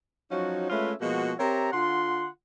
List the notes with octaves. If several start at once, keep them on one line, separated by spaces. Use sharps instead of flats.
F3 F#3 C#4 D#4 F#4
G#3 A3 C#4 F4 B4 E5
B2 F3 G#3 A#3 F#4
C4 G4 A#4 C#5 E5 A#5
D3 F4 F#5 C6